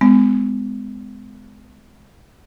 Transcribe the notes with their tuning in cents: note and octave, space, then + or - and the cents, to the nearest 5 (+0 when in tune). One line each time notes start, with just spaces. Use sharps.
G#3 +0 B3 +45